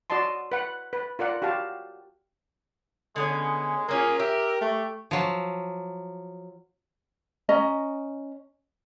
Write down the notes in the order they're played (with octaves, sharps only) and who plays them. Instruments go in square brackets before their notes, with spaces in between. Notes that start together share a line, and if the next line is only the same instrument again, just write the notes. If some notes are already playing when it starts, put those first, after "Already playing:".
[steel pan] F#4 D5 D#5 A5 C6
B4 F#5
B4
F4 A#4 D5 F#5
F#4 G4 F5 A5
[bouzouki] D3 B3 C#4 [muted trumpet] G#3
[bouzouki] A#3 C#4 F4 [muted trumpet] G#4 [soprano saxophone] A#4
[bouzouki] G4 [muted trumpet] E5
[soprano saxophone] A3 [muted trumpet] C#6
[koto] F3 F#3
[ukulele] C#4 D#5 A#5